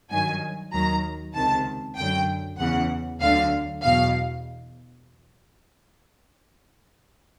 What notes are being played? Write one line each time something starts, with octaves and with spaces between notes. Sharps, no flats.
G2 D#3 F#3 G#5
D#2 D#3 F#3 A#5
C#2 C3 D#3 A5
F#2 D3 F#3 G5
E2 C#3 E3 F#5
D2 D3 F#3 F5
E2 B2 F#3 F5